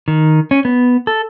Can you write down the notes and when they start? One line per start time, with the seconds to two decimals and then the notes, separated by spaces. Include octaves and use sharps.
0.08 D#3
0.51 C#4
0.65 B3
1.07 A4